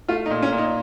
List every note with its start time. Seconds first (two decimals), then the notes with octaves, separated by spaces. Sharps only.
0.08 A3 F4
0.26 D#4
0.30 A#2
0.42 C#4
0.52 A#2
0.58 D#4